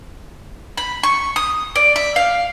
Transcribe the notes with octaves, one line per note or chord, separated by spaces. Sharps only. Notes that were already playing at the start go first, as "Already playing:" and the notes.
B5
C#6
D#6
D5
E5
F5